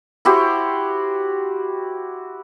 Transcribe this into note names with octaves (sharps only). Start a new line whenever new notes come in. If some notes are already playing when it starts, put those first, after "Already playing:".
E4 F#4 G4 C5